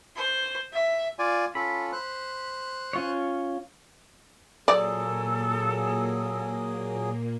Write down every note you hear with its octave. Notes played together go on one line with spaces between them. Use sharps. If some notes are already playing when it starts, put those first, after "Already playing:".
C5
E5
F4 D5 G#5
C#4 F4 A4 B5
C5 F#6
C#4 F4 C#5
A#2 F#3 A#3 G#4 A4 D5